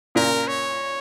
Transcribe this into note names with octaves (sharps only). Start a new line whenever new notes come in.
A#2 C#3 A#4
C#5